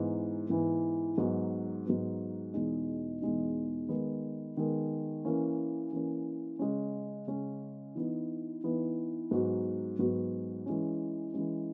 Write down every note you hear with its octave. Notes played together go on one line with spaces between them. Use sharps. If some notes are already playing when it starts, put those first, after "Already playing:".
Already playing: G#2 E3 B3
G#2 E3 B3
G#2 F#3 B3
G#2 F#3 B3
E2 B2 G#3 D#4
E2 B2 G#3 D#4
D#3 G#3 B3
D#3 G#3 B3
E3 A#3 C#4
E3 A#3 C#4
C#3 G#3 C#4
C#3 G#3 C#4
E3 B3 D#4
E3 B3 D#4
G#2 F#3 B3 F#4
G#2 F#3 B3 F#4
E3 G#3 C#4
E3 G#3 C#4